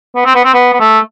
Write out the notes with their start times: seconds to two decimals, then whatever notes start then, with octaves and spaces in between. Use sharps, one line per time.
0.16 B3
0.26 C4
0.35 B3
0.45 C4
0.54 B3
0.73 B3
0.80 A3